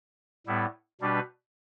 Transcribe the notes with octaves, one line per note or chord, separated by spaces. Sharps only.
A2 G3 B3 E4
B2 G3 D4 G4 B4